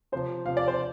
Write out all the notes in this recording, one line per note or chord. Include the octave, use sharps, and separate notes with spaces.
C3 F3 C5
C3 F3 F5
D5
C5